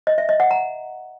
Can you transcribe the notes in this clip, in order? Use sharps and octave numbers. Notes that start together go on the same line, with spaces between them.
D#5
E5
D#5
F#5
A#5